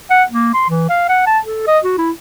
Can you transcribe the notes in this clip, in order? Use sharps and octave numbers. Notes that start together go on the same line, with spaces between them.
F#5
A#3
C6
E3
F5
F#5
A5
A4
D#5
F#4
E4